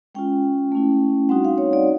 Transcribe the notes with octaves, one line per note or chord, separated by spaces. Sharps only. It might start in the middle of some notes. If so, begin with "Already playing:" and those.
G#3 C#4 F4 G5
A3 C#4 E4
G3 C4 D#4 F#4 F#5
F5
C#5
D5